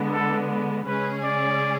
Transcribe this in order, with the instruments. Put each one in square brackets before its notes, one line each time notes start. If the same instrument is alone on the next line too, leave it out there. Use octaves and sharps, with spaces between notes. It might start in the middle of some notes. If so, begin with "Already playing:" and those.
Already playing: [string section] D3 G#3 B3
[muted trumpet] A4
[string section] C#3 G#3 C#4 G#4 [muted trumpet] B4
[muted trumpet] D5